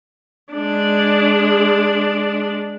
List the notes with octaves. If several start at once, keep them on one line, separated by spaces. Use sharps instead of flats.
G#3 D4